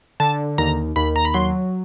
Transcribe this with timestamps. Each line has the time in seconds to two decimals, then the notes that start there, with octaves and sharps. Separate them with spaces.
0.20 D3 A5
0.58 D#2 A#5
0.96 D#2 B5
1.16 A#5
1.25 B5
1.34 F#3 C6